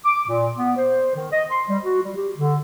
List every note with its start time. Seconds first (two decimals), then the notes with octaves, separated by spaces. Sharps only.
0.06 D6
0.29 A#2
0.56 B3
0.77 C5
1.15 D#3
1.32 D#5
1.51 C6
1.70 G3
1.83 F#4
2.02 G3
2.16 G4
2.36 D3